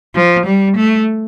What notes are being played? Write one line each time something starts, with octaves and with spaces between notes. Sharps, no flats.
F3
G3
A3